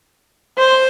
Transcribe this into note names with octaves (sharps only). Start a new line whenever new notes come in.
C5